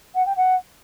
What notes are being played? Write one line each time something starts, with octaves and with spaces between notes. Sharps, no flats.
F#5
G5
F#5